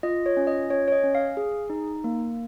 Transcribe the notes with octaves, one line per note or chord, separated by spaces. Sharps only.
F4 D#5
C#5
C#4
D#5
C#4 C#5
C#5
D#5
C#4
F5
G#4
D#4
A#3